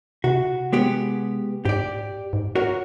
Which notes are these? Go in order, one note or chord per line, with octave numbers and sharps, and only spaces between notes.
C3 F#4
G#3 B3 G4
G#2 G4 D5
G#2
F#4 A#4 C#5